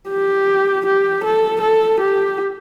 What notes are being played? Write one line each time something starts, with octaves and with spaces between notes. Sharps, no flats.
G4
G4
A4
A4
G4